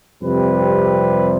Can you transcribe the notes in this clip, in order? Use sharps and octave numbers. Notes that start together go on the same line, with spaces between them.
F2 C3 G3 C4 B4